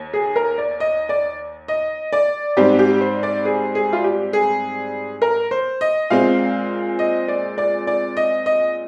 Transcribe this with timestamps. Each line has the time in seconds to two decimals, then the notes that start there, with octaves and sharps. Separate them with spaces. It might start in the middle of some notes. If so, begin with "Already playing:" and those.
Already playing: D#2
0.13 G#4
0.36 A#4
0.58 D5
0.80 D#5
1.09 D5
1.68 D#5
2.12 D5
2.57 G#2 G3 C4 G4
2.79 G4
3.01 C5
3.23 D5
3.45 G#4
3.75 G#4
3.93 F4
4.04 G4
4.33 G#4
5.22 A#4
5.51 C5
5.81 D#5
6.10 A#2 G#3 C4 F5
6.99 D#5
7.28 D5
7.58 D5
7.87 D5
8.17 D#5
8.46 D#5